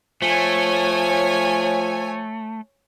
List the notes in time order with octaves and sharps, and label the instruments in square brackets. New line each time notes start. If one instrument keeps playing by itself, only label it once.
[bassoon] F3 [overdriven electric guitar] A3 [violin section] C#5 G#5